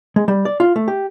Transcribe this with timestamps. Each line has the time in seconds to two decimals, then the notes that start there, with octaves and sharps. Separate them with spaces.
0.16 G#3
0.28 G3
0.45 D5
0.60 F4
0.76 A3
0.88 G4